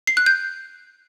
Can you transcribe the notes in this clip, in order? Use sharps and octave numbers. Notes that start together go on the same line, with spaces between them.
C7
F#6
G6